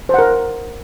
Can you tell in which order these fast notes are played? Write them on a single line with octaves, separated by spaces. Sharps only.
C5 F#5 A#4